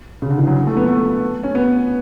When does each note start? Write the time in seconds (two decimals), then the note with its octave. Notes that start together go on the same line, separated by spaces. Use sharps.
0.22 C#3
0.30 D3
0.38 E3
0.47 F#3
0.67 A3
0.77 B3
0.88 A3
1.44 C#4
1.55 B3